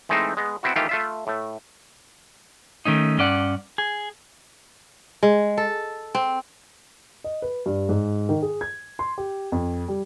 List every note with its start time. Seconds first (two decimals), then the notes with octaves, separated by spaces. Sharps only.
0.09 E3 G#3 A3 C4 D#4 C5
0.37 G#3 B3
0.63 B3 C4 E4 F#4
0.76 D#3 E3 A3 F4 G4
0.89 A3 F4 E5
1.27 A2 A3
2.85 D#3 A3 C#4 D#4
3.18 G2 C#4 D5 F#5
3.78 G#4
5.23 G#3
5.58 A4
6.15 C4
7.24 D#5
7.42 B4
7.66 G2
7.89 G#2
8.29 D#3
8.42 G#4
8.61 G#6
8.99 C6
9.18 G4
9.52 F2
9.88 G3